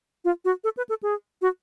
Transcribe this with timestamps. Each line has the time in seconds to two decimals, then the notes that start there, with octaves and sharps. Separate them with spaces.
0.25 F4
0.45 F#4
0.64 A4
0.77 B4
0.89 A4
1.03 G#4
1.42 F#4